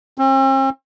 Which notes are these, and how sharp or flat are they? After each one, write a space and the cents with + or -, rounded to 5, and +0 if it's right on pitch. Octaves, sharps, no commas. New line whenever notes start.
C4 +45